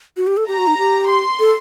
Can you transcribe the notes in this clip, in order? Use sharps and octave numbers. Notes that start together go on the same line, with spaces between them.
F#4
G4
A4
G4 A#5
F#4
D#4
G4
C6
A4